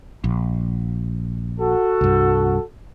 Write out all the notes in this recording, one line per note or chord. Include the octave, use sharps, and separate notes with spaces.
A#1
F#4 A4
C2 G2